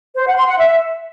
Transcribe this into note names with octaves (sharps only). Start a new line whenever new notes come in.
C5
F#5
C6
F#5
E5